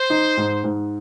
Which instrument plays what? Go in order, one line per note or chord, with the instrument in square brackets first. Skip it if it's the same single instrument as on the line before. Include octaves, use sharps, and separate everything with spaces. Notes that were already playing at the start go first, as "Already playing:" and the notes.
Already playing: [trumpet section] C5
[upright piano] D#4
G#2
G#2